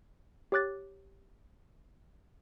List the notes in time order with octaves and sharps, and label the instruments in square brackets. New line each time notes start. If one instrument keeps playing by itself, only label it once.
[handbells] G4 C#5 D6 F#6 A6